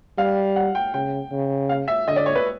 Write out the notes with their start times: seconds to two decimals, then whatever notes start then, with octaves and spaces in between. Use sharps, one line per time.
0.18 G3 F5
0.56 F#5
0.75 G5
0.94 C#3 G5
1.31 C#3
1.69 F5
1.88 E5
2.07 D3 D#5
2.16 D5
2.26 C#5
2.35 B4